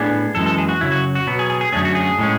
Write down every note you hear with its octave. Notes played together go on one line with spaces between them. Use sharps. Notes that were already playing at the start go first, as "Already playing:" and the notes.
Already playing: A2 B3 D4 G#4
F#2 E3 G#3 A4
A4
G#4
F#4
F#2 C#3 F#3 E4
F#4
F#4
B2 F#3 B3
G#4
G#4
G#4
F#2 D3 A3 C#4 G#4
F#4
G#4
A2 G#3 C#4